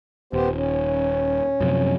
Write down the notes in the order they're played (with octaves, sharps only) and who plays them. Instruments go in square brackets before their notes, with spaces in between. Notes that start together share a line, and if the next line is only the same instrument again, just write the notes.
[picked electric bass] D#1 [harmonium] B3 G4 C5
[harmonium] C#4
[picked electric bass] F#2 C3 F3